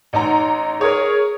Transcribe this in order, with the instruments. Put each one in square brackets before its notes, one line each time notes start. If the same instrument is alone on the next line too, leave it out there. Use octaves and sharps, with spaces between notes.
[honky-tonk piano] A1 D#4 A#5
[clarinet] G#4 [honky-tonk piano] A#4 C#5